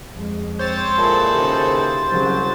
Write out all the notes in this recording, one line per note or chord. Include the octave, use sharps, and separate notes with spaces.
F2 G#3
C4 C5 C#5 A6
A#2 E4 G#4 A4
D#2 C#3
C2 C#3 F#3